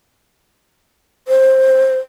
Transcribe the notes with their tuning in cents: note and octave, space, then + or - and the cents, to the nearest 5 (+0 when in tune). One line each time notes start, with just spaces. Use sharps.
C5 +15